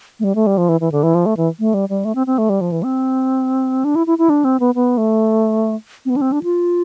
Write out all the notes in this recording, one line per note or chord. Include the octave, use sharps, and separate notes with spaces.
A3
G3
A3
G3
F3
E3
E3
D3
E3
F3
A3
E3
A3
G3
G3
A3
C4
C4
A3
G3
F3
E3
C4
D4
E4
E4
E4
D4
C4
B3
B3
A3
C4
B3
D4
C4
D4
F4